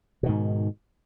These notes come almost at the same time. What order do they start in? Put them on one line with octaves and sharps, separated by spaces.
B2 D#3 G#2